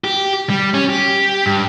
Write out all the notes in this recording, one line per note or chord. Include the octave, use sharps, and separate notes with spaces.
G4
G3
C#4
G4
G2